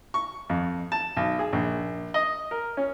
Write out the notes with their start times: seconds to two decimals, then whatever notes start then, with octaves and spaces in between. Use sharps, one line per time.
0.14 C#6
0.50 F2
0.92 A5
1.17 B1
1.39 G#4
1.53 A#1
2.14 D#5
2.51 A#4
2.77 C#4